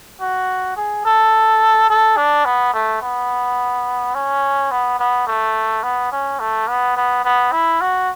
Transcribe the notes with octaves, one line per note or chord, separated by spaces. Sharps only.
F#4
G#4
A4
A4
D4
B3
A3
B3
C#4
B3
B3
A3
B3
C#4
A3
B3
B3
B3
E4
F#4